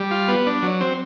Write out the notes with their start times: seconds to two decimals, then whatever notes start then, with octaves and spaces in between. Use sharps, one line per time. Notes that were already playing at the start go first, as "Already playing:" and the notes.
Already playing: G3
0.11 F4
0.28 B3
0.46 D4
0.62 F#3
0.81 C4